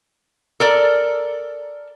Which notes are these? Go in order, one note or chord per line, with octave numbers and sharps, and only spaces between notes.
A4 A#4 D5